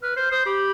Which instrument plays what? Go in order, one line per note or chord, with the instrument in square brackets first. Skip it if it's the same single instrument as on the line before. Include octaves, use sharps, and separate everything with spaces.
[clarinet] B4 [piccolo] F6
[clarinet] C5 [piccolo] F6
[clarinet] C5 [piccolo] D#6
[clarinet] G4 [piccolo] B5